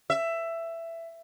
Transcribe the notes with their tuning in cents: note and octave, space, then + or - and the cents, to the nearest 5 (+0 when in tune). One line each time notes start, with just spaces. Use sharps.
E5 +15